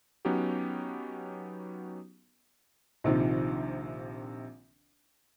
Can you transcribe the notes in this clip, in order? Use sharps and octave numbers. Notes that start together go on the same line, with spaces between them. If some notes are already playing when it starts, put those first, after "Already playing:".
F#3 B3 C#4 D#4 F#4 G4
A#1 C3 D#3 F3